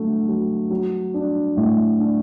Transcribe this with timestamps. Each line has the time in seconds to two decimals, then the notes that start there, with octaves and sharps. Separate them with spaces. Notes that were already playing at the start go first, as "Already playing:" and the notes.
Already playing: D3 F#3 A3
0.28 F#3
0.70 F#3
1.14 D4
1.57 A2
1.99 D4